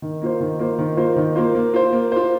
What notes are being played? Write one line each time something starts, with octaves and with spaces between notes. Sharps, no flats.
D#3
A#3 F4 C5
D#3
A#3 F4 C5
D#3
A#3 F4 C5
D#3
A#3 F4 C5
A#3
F4 C5
A#3
F4 C5